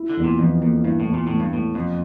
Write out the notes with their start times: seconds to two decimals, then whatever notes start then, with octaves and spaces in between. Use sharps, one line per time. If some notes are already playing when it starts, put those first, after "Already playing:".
Already playing: E4
0.10 D3
0.17 E2
0.24 A#2
0.39 F2 E3
0.62 F2 A#3
0.84 G2 E4
1.00 A2
1.07 E2
1.14 A#2
1.27 A2 E3
1.40 G2
1.52 A2 A#3
1.75 F1 F2